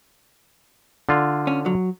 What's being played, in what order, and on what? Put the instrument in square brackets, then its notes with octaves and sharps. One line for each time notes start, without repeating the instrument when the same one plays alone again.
[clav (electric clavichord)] D3 F4
[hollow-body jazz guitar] C#4
F#3